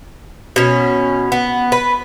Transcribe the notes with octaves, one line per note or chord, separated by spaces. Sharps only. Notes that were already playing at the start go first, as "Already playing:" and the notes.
B2 C#4
B3
B4